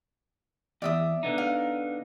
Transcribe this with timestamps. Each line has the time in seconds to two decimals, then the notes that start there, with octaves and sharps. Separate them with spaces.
0.82 E2 D5 E5 D#6
1.23 D3 B3 D#4
1.38 F5